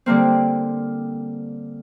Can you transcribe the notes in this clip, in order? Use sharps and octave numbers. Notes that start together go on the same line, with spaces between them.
D3 G3 A#3 C4